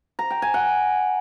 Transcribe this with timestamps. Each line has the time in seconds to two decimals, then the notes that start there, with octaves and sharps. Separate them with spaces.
0.19 A#5
0.30 G5
0.42 G#5
0.54 F#5